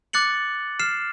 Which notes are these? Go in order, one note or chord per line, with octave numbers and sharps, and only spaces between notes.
D6 F#6 A6 C#7 F#7
F6 C7 E7